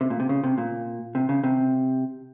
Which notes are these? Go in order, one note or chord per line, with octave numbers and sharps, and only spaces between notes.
C3
A#2
C3
C#3
C3
A#2
C3
C#3
C3